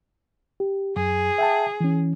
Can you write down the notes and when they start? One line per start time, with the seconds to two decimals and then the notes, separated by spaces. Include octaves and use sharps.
0.60 G4
0.96 F#2 G#4
1.38 E5 G5 A5
1.80 E3 C#4